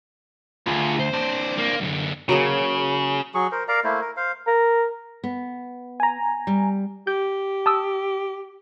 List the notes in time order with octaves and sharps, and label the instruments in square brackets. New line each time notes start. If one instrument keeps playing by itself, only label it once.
[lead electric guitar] D2 [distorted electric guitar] F4 G#4
[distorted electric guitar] C5
[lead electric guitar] C4 D4
[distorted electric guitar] A#3
F#2 D3
[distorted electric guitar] C#3 [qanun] F#3 A#3 G#4
[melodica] F#3 G#4 C#6
A#4 C5
A#4 D5 F5 A#5
A3 A#3 E4 C5
A#4
C5 F5
[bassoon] A#4
[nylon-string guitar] B3
[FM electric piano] G#5 A#5
[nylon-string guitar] G3
[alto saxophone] G4 [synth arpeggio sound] G6
[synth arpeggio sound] A5 D#6 E6